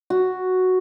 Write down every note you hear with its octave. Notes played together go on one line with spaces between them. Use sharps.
F#4